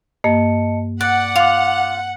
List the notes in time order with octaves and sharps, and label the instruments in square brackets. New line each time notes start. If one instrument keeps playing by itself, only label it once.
[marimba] G2 A#3 [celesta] D#5 A5 C#7
[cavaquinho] D5 [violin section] F#5 [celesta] F#6
[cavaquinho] F4 [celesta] D6 F7